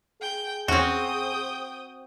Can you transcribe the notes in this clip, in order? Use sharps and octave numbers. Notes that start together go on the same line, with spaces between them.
G#4 G5
E2 C4 C#4 F#4 G5 D#6